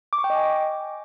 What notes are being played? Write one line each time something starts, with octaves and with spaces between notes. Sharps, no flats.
D6
C#6
G5
D#5
G#5